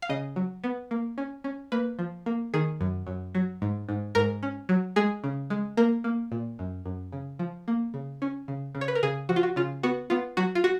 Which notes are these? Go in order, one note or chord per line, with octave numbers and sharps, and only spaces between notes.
F5
C#3 D#5
F#3
B3
A#3
C#4
C#4
A#3 B4
F3
A#3
D#3 G#4
F#2
F#2
F#3
G#2
G#2
G#2 A#4
C#4
F#3
G#3 G#4
C#3
G#3
A#3 A#4
A#3
A#2
F#2
F#2
C#3
F3
A#3
C#3
C#4
C#3
C#3
C#5
B4
A#4
C#3 G#4
F3 F#4
F4
F#4
C#3 F4
B3 F#4
B3 F4
F#3 F#4
F4
F#4